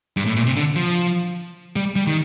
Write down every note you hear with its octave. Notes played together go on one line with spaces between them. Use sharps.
G2
A2
A#2
C3
D3
F3
G3
G3
D#3